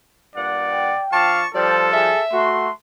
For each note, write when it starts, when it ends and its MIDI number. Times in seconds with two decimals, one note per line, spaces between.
0.36 0.92 43
0.36 0.92 46
0.36 1.05 74
0.36 0.92 78
0.70 1.32 79
1.12 1.45 53
1.12 1.45 62
1.12 1.41 77
1.12 1.45 81
1.12 1.48 85
1.55 2.12 53
1.55 2.12 55
1.55 2.24 69
1.55 1.90 72
1.55 1.78 74
1.93 2.21 68
1.93 2.50 76
2.33 2.69 57
2.33 2.68 66
2.33 2.73 84